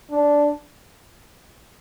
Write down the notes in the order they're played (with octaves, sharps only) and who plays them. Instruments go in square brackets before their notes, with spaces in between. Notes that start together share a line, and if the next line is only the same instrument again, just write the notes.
[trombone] D4